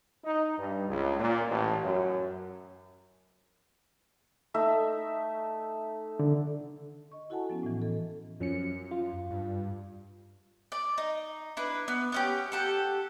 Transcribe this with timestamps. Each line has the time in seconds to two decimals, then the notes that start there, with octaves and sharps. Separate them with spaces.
0.25 D#4
0.57 G2
0.89 C#2
1.18 A#2
1.49 A1
1.83 F#2
4.54 A3 D#4 E5
6.19 D3
7.12 D#5 C#6
7.30 E4 F#4 A4 F#5 G#5 A5
7.50 F3 B3 C#4
7.63 A2 E3
7.82 A4 D#5
8.40 F#2 F3 C#4 C#7
8.91 F4
9.30 G2
10.72 D5
10.98 D#4
11.57 D4 E4 B4
11.88 B3
12.12 B3 C#4 G4
12.52 G4 A4 F#5